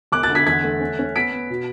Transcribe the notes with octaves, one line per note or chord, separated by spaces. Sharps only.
E1 D6 F#6
F#6 A6
D3
G#6 B6
E2 G#6 B6
A3
C#4
C#4
B3 B6 D7
B3
B2